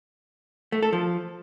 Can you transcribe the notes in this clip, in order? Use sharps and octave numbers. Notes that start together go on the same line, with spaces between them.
A3
A4
F3